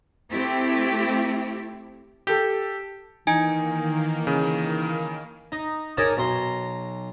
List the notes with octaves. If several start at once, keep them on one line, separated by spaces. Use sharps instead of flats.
A3 C4 E4 G4
G4 A4
D#3 E3 A#3 D#4 G#5 G#6 D7
C#3
D#4
D#4 G#4 A#4 C#5 D5 A5
B1 A#5 C6